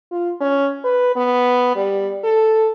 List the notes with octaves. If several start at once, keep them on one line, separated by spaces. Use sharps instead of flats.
F4
C#4
B4
B3
G3
A4